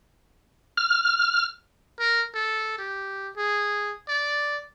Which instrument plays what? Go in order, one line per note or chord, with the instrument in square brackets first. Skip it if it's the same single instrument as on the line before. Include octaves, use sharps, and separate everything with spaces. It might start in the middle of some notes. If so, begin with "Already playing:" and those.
[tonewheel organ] F6
[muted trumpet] A#4
A4
G4
G#4
D5